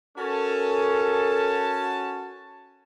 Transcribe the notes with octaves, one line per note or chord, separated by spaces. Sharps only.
C#4 F#4 A4 A#4 A5